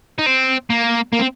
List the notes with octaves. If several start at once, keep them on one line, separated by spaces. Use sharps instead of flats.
D#4
C4
A#3
A#3
C4